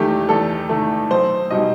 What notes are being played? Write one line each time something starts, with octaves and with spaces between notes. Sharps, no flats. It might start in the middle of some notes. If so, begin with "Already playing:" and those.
Already playing: E2 D#3 A3 G4
E2 A4
D#3 A3
B1 C5
B2 G3 D#4 D#5